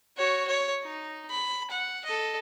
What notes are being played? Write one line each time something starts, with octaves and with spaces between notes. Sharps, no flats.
F#4 C#5
C#5
D#4
B5
F#5
A4 D#5